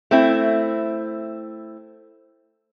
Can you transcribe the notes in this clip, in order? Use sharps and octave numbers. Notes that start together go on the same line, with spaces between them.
A3 C4 E4